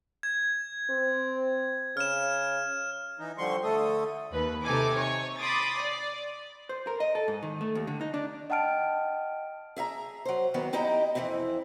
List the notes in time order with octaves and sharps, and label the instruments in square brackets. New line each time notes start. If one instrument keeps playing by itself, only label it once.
[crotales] G#6
[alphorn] C4
[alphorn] C#3 [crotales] F6 E7
[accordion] E3 D#4
D3 F3 G3 C6 C#6
D3 A3 A4 D#6
[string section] D#2 B4
C3 D#4 A4 G#5 D6
C#5 C#6
B5 C6 D6 D#6 A6
D5
[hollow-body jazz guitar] C5
A#4
D#5
A4
G#2
D#3
A3
D#2
D3
D#4
D4
[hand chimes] D#5 F#5 G5 A5 F6 D7
[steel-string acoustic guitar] G#4 E5 F5 A#5
F#3 C5
D#3 E3 F#3 B3
C4 D#4 E4 G4 D#5 A#5
F2 D#3 E3 C4 E4